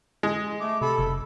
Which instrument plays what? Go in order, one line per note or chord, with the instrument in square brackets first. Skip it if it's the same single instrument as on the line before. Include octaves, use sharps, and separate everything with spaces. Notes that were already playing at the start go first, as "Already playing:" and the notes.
[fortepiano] G#3
[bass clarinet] A3 [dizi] D6
[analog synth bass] C3 [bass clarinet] A4 [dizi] B5
[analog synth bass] F#1